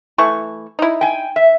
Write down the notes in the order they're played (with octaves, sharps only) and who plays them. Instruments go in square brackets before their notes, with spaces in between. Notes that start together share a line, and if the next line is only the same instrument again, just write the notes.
[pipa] E3 A3 C#6
D#4 E4
[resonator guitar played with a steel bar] G5 G#5
E5